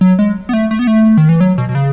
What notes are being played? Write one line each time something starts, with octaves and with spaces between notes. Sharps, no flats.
F#3
G#3
B3
A3
A3
B3
A3
D#3
E3
F#3
B2
B2
C#3